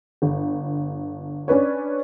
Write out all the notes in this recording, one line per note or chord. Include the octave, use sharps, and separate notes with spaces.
G1
C#4 D4 B4 C#5